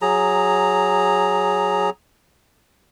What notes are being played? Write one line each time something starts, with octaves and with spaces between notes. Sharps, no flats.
F#3 G#4 A#5